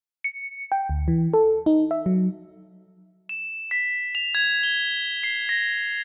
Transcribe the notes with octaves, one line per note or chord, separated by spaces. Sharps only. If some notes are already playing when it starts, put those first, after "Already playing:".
C#7
G5
D2
E3
A4
D#4
E5
F#3
E7
B6
F7
G#6
G7
C7
A#6